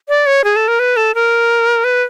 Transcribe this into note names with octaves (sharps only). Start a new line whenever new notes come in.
D5
C#5
G#4
A4
A#4
B4
A4
A#4
B4